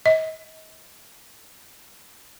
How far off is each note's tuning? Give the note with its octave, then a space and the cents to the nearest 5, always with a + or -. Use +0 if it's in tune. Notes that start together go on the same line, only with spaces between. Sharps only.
D#5 +35